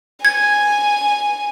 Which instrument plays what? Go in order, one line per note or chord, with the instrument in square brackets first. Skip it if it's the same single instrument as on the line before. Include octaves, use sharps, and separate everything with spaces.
[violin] G#5 [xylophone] G#6